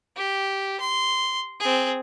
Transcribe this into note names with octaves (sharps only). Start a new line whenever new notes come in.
G4
C6
C4 G#4